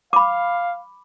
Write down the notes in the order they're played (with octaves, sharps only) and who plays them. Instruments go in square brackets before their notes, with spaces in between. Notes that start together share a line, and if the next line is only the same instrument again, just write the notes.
[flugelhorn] F5 [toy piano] B5 D6